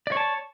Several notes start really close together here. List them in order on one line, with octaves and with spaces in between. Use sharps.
D5 C#5 A5